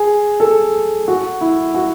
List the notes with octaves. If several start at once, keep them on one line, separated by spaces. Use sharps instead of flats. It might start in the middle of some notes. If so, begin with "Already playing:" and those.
Already playing: G#4
A4
F#4
E4
F#4